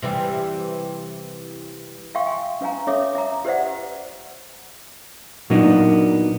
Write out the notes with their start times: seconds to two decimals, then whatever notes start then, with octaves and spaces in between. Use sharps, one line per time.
0.02 C3 E3 G3
2.15 E5 F5 G5 C6 C#6
2.27 G#5
2.61 C#4 B4 F5 G#5 A#5
2.87 C#4 A4 C#5 E5 D6
3.15 E5 A#5
3.45 G4 B4 C5 D5 E5 F#5
5.50 A#2 F#3 A#3 B3 D4 D#4